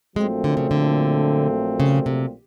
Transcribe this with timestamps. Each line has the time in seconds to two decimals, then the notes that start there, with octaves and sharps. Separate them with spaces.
0.16 A#1 A#2 F#3 G#3 A3 C4
0.44 D3
0.57 C#3
0.71 D3
1.80 C#3
2.06 C3